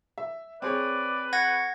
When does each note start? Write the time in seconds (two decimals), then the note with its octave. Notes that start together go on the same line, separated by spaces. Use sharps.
0.18 E5
0.62 C4 G#4 B4 C#5 D5
1.33 F#5 C#6 G#6 A#6